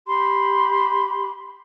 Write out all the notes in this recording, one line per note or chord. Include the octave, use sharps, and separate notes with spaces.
G4 B5 C6